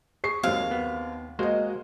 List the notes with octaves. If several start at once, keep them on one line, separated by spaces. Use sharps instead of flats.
G#4 C#6 C7
D#2 F#3 G#3 C4 F5
B3
G#3 A#3 F#4 C5 D#5